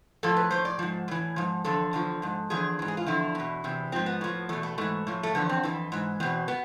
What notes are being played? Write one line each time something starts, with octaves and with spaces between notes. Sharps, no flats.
A2 F3 A4
B4
A2 F3 C5
D5
G#2 F3
A2 E3
G#2 F3
E2 D3 F3 A4
E2 D3 F3
G#2 F3
E2 D3 F3 G#4
G#2 E3
G#4
F4
E2 D3 F3 E4
E2 B2
E2 C3 E3
G#2 F3 C4
B3
A2 F3
E2 B2 A3
A3
G#2 E3 A3
A2 F3
A3
E2 D3 F3 B3
C4
F2 E3
G#2 E3
E2 B2 C4
B3